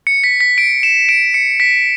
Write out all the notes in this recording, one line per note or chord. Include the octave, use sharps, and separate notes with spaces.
C#7
B6
B6
D7
E7
D7
C#7
B6